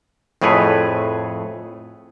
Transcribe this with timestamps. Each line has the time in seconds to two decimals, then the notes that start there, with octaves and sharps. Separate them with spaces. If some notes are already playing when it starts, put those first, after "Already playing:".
0.42 F2 A2 A3 G#4 B4 C#5